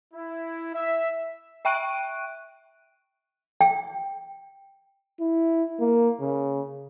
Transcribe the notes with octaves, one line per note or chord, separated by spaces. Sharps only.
E4
E5
E5 G5 C#6 F#6 D7 D#7
G5
E4
A#3
C#3